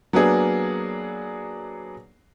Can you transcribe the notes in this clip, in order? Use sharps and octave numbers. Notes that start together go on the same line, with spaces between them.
F#3 A#3 B3 D4 G#4